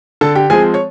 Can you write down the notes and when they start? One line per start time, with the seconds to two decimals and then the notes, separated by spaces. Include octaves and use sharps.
0.21 D3 A4 A5
0.35 G4 G5
0.50 F3 G#3 C4 G#4 G#5
0.74 C#5